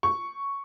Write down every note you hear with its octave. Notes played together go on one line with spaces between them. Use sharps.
C#6